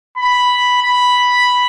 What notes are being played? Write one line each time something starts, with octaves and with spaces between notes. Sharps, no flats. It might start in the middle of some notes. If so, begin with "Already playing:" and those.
B5
B5